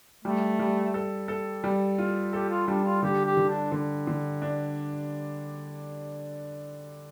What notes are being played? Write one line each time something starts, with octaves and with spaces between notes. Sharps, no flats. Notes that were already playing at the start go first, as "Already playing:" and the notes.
G3 A3
G3
A4
A4
G3
F4
G4 A4
F4
G3 D4
F4
D3 G4
G4
D3
D4
D3
D3
D4